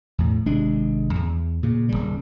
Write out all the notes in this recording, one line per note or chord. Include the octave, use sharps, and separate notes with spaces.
E2 A2
G#1 C3 G#3 D4
E2
A#2 C#3
D#1 A#1 C#3 G3